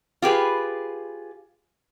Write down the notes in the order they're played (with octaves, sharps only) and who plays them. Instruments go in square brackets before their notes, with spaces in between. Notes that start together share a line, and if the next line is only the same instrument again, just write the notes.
[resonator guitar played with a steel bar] F4 G4 G#4 B4